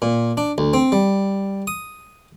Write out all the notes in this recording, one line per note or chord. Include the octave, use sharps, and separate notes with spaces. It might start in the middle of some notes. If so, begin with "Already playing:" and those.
A#2
D4
D2
C4
G3
D#6